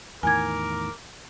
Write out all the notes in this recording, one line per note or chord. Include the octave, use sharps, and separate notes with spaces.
E2 A2 D#3 A#4 G#5 D6 G#6